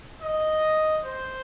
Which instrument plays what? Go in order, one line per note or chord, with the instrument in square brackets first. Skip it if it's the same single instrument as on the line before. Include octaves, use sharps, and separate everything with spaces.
[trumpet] D#5
C5